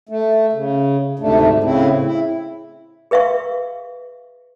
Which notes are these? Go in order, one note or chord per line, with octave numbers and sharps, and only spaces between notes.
A3
C#3
D2 G#2 C3 A3 D4
A2 C#3 C4 E4
E4
G#4 B4 E5 F5 C#6